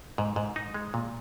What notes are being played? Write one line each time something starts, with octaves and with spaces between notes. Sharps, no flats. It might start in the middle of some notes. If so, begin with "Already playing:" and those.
G#2
G#2
D#4
G#3
A#2